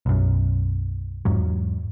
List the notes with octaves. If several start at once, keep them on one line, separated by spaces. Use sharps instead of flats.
B1 F#2
E2 G#2 F#3